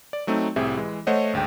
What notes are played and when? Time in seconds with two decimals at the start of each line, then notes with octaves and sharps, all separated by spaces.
0.13 D5
0.27 F#3 A3 C4 D#4
0.56 C2 A2 C4 G4 G#4 E5
0.77 E3 G#3
1.07 A3 C5 C#5 D#5 F#5
1.33 G#1 D2 G#3 G5